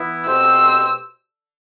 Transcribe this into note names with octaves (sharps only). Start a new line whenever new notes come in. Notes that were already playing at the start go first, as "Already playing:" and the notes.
Already playing: E3 B3 E4
B2 A3 C4 G4 C5 E6